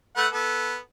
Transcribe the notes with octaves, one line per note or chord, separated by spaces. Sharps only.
A3 B4 F#5
B3 A4